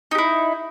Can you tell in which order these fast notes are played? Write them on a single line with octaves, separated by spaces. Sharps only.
D#4 G4 E4